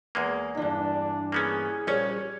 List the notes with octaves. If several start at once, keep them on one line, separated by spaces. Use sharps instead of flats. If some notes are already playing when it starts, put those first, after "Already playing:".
E2 G#3 A#3
G2 E3 D4
A#3 B3 C#4 G#4
A#1 G3 C#4 C#5 D5